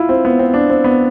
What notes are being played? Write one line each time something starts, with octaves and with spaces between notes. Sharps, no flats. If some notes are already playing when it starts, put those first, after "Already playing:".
Already playing: E4 F4
C4
B3
C4
D4
C4
B3